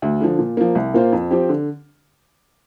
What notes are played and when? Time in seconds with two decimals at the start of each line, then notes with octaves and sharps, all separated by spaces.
0.02 D2
0.21 D3 F3
0.39 A#2
0.57 F3 A#3
0.75 C2
0.94 A#2 A#3 F4 C5
1.13 F2
1.31 F3 C4 G4
1.49 D3